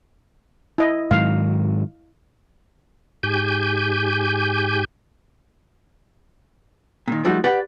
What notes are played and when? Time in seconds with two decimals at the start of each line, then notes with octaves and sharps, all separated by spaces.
0.78 E4 D#5
1.11 G#2 D#3 F#3 F5
3.23 G#2 G4 G#5 G6
7.08 A#2 D#3
7.25 F3 G3 A3 D#4 F#4
7.44 G4 B4 D5 F#5